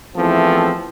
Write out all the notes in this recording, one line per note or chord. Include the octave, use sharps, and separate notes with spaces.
E2 E3 F3 A3 C4